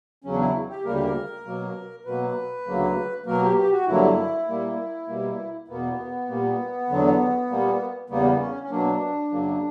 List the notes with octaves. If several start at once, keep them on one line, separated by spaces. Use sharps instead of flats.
E2 C#3 F#3 C#4
D4
E4
G4
D2 C#3 G3 A#3 A#4
G4
A#4
B2 F#3 A#3
B2 F#3 A#3 B4
D2 C#3 F#3 A#3
B2 F#3 A#3 A#4
G4
G4
F#4
G2 D3 F#3 A#3 E4
A#2 G3 A#3
B2 G3 A#3
E2 B2 A#3 B3
A#2 G3 A#3
E2 D3 F#3
A#2 G3 A#3
E2 C#3 G3 A#3 B3
C#4
C#4
B2 F#3 A#3 D4
F#2 C#3 F#3 A#3